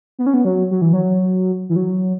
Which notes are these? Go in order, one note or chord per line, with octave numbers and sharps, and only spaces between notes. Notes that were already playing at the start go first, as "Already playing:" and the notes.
B3
C#4
B3
F#3
F#3
E3
F#3
E3
F#3